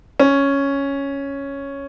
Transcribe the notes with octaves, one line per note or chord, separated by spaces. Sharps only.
C#4